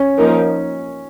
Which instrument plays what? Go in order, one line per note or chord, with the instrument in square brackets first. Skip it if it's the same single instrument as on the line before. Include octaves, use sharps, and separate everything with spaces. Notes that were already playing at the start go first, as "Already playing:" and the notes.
Already playing: [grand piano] C#4
[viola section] F3 A#3 D#4 A#4